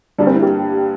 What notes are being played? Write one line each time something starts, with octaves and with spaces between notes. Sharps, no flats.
G2 D3 G3 A#3 D4
C4
E4
G4